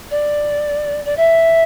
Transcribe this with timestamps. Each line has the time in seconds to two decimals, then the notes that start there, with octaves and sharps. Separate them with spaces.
0.10 D5
1.05 D5
1.16 E5